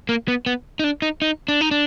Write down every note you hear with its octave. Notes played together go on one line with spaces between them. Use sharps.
A#3
B3
B3
D#4
D4
D#4
D#4
D4
D#4
D4